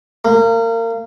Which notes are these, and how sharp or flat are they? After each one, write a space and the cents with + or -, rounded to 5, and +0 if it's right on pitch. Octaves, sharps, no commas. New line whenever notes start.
A#3 -30